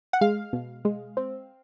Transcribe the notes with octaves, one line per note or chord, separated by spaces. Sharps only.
F#5
G#3 F5
B2
G#3
C4